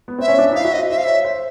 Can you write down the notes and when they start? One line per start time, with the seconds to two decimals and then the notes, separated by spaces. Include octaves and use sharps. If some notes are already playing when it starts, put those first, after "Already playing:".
0.08 B3
0.19 C4 E5
0.28 C#4
0.38 D4
0.52 D#4
0.56 E4 F5
0.64 F#4 E5
0.73 C5 D#5
0.90 C5 E5
0.98 F5
1.04 C#5 E5
1.25 C5